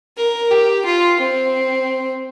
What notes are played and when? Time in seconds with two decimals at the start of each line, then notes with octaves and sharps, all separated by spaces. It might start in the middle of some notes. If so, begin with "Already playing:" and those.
0.17 A#4
0.51 G4
0.86 F4
1.20 C4